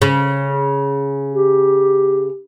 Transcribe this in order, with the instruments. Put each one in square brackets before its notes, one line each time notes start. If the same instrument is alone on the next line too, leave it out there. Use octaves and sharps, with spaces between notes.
[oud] C#3
[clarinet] G4